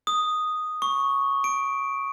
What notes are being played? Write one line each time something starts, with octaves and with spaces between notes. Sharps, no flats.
D#6
C#6
D7